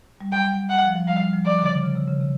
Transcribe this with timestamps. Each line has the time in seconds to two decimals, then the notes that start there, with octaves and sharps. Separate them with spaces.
0.21 G3
0.32 F#3 G5
0.70 F#5
0.84 F3
0.95 F#3
1.07 G3 F5
1.20 F#3
1.33 F3
1.46 D#3 D5
1.58 D3
1.64 C#3
1.83 C#3
1.95 C3
2.08 C#3
2.20 C3